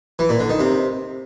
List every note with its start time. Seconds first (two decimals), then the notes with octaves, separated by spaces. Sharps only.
0.19 E3
0.29 A#2
0.39 D3
0.50 D#3
0.60 C3